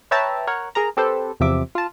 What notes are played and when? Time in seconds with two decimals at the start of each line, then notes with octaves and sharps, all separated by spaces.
0.11 B4 C#5 E5 G5 A5 A#5
0.47 A#4 C#5 F#5
0.75 G#4 A#4 A#5
0.97 C4 G4 A4 B4 C5
1.40 E2 C3 F3 E5 D6
1.75 F4 A5